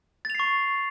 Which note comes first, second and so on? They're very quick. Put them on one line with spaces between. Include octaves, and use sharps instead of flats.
A6 F7 C7 C#6